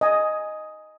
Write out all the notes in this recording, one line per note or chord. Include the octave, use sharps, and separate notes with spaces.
D#5 G#5